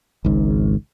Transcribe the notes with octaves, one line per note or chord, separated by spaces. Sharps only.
G#1 C#2 G#2